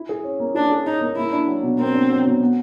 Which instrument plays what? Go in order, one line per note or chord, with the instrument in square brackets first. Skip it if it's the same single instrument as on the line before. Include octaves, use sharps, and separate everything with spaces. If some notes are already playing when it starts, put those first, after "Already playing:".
Already playing: [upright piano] E4
G#4
C#4
A#3
[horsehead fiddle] D4 [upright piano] E4
[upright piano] G#4
[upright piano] C#4 [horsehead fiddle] D#4
[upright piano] A#3
[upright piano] A#3 [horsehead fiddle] E4
[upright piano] D4
F#3
B2
[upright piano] A#3 [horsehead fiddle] C4
[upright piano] D4
F#3
B2
B3